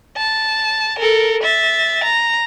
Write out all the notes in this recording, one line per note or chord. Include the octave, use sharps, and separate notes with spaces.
A5
A4 A#4
E5 A6
A#5